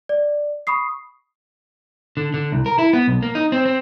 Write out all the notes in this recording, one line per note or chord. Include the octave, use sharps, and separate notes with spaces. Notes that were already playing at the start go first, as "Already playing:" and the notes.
D5
B5 C#6 D#6 C7
D3
D3
C2
A#4
E4
B3
B1
A#3
D#4
C4
C4